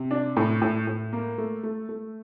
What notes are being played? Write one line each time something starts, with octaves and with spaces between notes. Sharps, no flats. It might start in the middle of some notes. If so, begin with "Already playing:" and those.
Already playing: C3
D4
A2
A2
A2
A#3
A3
A3
A3